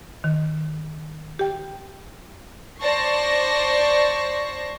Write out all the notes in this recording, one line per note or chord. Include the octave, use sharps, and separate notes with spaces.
D#3
G4 G5
C5 D5 A5 C#6 A#6 C7